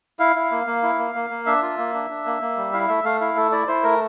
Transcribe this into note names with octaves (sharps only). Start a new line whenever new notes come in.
E4 F5
E4
A#3
A#3
E4
A#3
A#3
A#3
D4 E5
F4
A#3
D4
D4
A#3
A#3
G3
E4 F5
A3 E5
A3 F5
E4 F5
A3 A4
E4 D5
E4 C5
A3 A#4